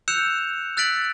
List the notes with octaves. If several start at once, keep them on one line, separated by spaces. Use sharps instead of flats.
E6 F#6 G6 C#7 E7 F7
E6 F#6 A6 B6 D7 F#7